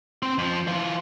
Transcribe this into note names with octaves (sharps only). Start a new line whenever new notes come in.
C4 C6
F2 F3
E3 F4